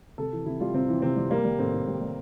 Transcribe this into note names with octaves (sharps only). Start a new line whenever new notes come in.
C3 A4
E3
C3 E4
G3 F4
C3 C4
E3
C3 C4
G3
G3 A#3
G3
A2 C4
A2
G3
G3